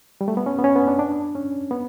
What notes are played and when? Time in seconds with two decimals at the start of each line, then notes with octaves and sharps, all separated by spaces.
0.21 G3
0.28 A3
0.37 B3
0.46 C#4
0.58 B3
0.64 C#4
0.76 B3
0.88 D4
0.99 D4
1.35 C#4
1.71 B3